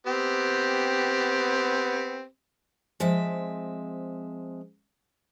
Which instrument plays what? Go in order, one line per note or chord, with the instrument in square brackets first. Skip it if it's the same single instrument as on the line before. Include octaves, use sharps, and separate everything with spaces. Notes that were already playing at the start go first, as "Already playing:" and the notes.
[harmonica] B3 C4 G4
[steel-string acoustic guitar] F3 G#3 C4 E5